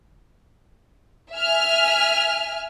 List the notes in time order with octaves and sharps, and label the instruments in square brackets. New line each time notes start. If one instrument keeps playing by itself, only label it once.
[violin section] E5 G#5 F6